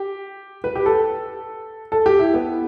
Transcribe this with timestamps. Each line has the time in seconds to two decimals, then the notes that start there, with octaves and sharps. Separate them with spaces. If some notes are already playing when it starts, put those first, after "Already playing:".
Already playing: G4
0.64 B4
0.76 G4
0.86 A4
1.92 A4
2.06 G4
2.19 E4
2.34 B3